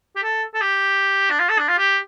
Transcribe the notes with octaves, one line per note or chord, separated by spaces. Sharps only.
G4
A4
A4
G4
D4
F4
A4
D4
F4
G4